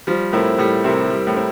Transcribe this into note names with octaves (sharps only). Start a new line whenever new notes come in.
F3 G3
A2 C4 E4 A#4
A2 G3
C3 C4 E4 A#4
G3
A2
C4 E4 A#4